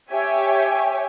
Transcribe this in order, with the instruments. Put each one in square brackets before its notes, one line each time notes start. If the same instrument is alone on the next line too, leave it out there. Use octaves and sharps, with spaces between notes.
[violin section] G4 C#5 E5 G#5